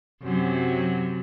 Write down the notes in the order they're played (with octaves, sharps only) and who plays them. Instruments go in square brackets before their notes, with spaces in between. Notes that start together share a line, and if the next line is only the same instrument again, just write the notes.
[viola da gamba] F#2 C3 F#3